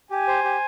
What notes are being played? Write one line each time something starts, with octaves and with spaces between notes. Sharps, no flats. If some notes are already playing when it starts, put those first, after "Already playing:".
G4 G#5
C5
G4